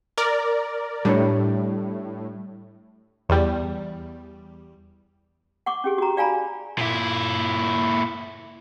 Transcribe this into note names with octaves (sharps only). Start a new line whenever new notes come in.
A#4 D5
A2 G3 D4 C#5
E2 G3
F#5 C#6 D6
C#4 G4 G#4
F#4 A#5
D5 F5 G#5 A#5 B5
A#2 E4